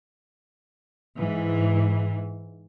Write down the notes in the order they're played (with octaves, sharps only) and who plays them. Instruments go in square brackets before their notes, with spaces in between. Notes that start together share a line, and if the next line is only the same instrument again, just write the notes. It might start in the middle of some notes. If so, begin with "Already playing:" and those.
[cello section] G#2 E3